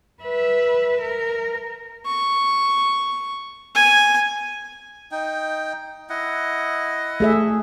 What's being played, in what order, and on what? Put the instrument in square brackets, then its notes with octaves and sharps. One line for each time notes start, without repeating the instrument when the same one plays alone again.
[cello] B4 E5
A#4
[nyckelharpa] C#6
G#5
[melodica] D#4 G5
E4 D#5 F#5
[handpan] A3 G#4 E5